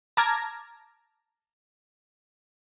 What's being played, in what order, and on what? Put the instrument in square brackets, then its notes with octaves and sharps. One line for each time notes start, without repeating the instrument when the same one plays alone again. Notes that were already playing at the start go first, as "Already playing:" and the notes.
[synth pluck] A5 A#5 D6 F6 G#6 A#6